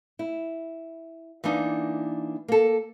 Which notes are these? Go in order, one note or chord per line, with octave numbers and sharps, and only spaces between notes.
E4
E3 A#3 B3 D4 D#4
A#3 A4